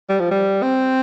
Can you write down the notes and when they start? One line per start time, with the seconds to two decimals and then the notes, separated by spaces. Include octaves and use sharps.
0.09 G3
0.20 F3
0.31 G3
0.62 C4